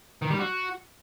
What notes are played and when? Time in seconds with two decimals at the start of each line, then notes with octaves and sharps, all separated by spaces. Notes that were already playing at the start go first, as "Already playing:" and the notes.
0.22 D#3
0.31 G3
0.39 F#4